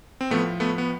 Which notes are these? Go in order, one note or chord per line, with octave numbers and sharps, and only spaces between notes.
C4
A2 F3 A3 B3
A3 B3
B3